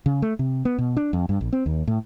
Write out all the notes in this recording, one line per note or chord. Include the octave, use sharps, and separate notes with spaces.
C#3
A3
C3
B3
B2
D4
F2
G2
A#1
C4
D#2
A2